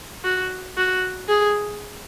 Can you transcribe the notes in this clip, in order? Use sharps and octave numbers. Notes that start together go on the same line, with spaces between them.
F#4
F#4
G#4